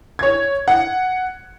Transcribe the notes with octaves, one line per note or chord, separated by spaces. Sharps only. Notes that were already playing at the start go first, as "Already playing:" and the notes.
C#5 G#6
F#5